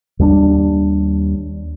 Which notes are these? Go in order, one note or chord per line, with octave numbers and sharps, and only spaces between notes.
D#2 G3 A#3 D4